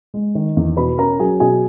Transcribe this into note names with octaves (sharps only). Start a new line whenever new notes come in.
G#3
D#3
E2
B2 B4 B5
C#4 A#4 A#5
F#3 G#4 G#5
B2 G#4 G#5